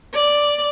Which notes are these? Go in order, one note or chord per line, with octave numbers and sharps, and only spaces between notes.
D5